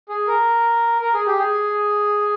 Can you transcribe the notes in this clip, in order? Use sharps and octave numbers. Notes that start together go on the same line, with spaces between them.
G#4
A#4
A#4
G#4
G4
G#4